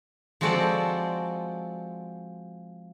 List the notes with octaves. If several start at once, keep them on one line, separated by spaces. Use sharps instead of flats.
F3 G#3 C4 F#4 A4 D5